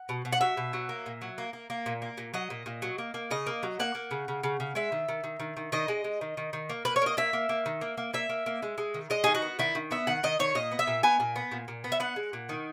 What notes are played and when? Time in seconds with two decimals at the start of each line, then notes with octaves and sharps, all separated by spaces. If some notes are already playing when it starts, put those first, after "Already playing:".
Already playing: F#5
0.09 B2
0.25 B2
0.33 F#5
0.41 F#3 E5
0.57 B2
0.73 F#3
0.89 A#3
1.06 A#2
1.22 F#3
1.38 A#3
1.53 A#3
1.70 A#3
1.86 A#2
2.02 A#3
2.18 A#2
2.34 F#3 D#5
2.50 A#2
2.66 A#2
2.82 F#3
2.98 A#3
3.14 A#3
3.31 C#3 D#5
3.47 A#3
3.63 F#3
3.80 A#3 F#5
3.95 A#3
4.11 C#3
4.28 C#3
4.43 C#3
4.60 C#3
4.75 G#3 E5
4.92 D#3
5.09 D#3
5.24 D#3
5.40 D#3
5.57 D#3
5.72 D#3 D#5
5.88 G#3
6.04 G#3
6.21 D#3
6.37 D#3
6.53 D#3
6.70 A#3
6.85 A#3 B4
6.96 C#5
7.02 A#3 D#5
7.17 A#3 E5
7.33 A#3
7.49 A#3
7.66 D#3
7.81 A#3
7.98 A#3
8.13 A#3 E5
8.29 A#3
8.46 A#3
8.63 G#3
8.78 G#3
8.94 D#3
9.10 G#3 D#5
9.24 D#3 G#4
9.35 F#4
9.42 B3
9.59 D#3 E4
9.75 D#3
9.91 B3 E5
10.07 D#3 F#5
10.23 D#3 D#5
10.39 D#3 C#5
10.55 A#2 D#5
10.72 B3
10.79 E5
10.87 A#2
11.03 B3 G#5
11.20 A#2
11.36 B3
11.52 A#2
11.68 A#2
11.84 B3
11.92 E5
12.00 B3 F#5
12.16 G#3
12.33 A#2
12.49 D#3